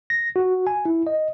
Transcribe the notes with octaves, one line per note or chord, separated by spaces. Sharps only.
A#6
F#4
G#5
E4
D#5